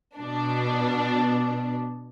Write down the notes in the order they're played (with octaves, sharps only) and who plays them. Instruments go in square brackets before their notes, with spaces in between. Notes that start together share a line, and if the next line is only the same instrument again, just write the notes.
[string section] B2 D4